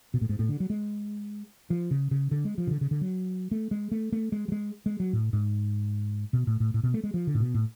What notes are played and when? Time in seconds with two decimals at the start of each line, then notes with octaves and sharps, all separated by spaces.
0.14 B2
0.21 A2
0.29 G#2
0.39 A2
0.49 D3
0.60 F#3
0.70 G#3
1.70 F3
1.91 C#3
2.11 C#3
2.31 D3
2.45 G#3
2.58 F3
2.67 C#3
2.71 D3
2.81 C#3
2.91 D3
3.01 F#3
3.51 A3
3.71 G#3
3.91 A3
4.12 A3
4.32 G#3
4.48 F#3
4.52 G#3
4.86 G#3
5.00 F#3
5.13 A2
5.33 G#2
6.33 B2
6.47 A2
6.60 A2
6.74 A2
6.83 B2
6.94 A3
7.04 G#3
7.14 F3
7.27 D3
7.35 A2
7.40 B2
7.54 A2